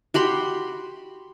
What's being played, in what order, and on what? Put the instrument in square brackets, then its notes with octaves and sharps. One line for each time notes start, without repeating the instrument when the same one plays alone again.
[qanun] F#4 G4 B5 C6